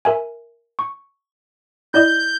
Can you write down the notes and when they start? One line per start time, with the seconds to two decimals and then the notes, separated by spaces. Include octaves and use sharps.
0.05 A#4 E5 G#5
0.79 C#6
1.94 E4 D5 D#5 G6